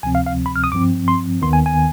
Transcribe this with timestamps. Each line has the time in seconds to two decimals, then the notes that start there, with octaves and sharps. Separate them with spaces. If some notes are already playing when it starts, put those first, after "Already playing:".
0.03 D2 C3 F3 C4 G#5
0.15 F5
0.26 F5
0.46 B5
0.56 F6
0.64 D#6
0.72 G2 F3 C4 D6
1.08 C6
1.42 D#2 D#3 B3 C6
1.53 G#5
1.66 G#5